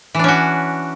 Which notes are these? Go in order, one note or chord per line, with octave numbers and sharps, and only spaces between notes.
E3 C#4 D4 F#4